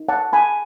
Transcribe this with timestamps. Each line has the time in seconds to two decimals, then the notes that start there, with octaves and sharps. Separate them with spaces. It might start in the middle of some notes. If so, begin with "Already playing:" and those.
Already playing: D#4
0.08 C#5 F#5 A5
0.32 G#4 G#5 B5